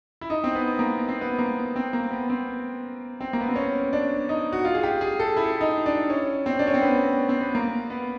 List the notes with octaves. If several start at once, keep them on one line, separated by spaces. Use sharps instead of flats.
E4
D#4
C4
B3
A#3
C4
B3
A#3
C4
A#3
B3
C4
C4
A#3
B3
C4
C#4
D4
D#4
F#4
F4
G#4
G4
G#4
A4
E4
D#4
D4
C#4
C4
D4
C#4
C4
B3
C4
B3
A#3
B3